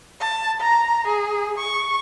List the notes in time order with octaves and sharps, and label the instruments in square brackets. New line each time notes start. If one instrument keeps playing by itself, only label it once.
[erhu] A5
A#5
G#4
C#6